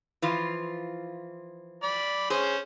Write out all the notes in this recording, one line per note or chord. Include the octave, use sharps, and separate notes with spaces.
E3 F3 F4
D5 B5
C#4 G#4 C5